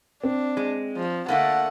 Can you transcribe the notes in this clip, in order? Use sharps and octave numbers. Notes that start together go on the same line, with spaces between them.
C4 D4
G#3
F3
D3 A3 A#3 F#5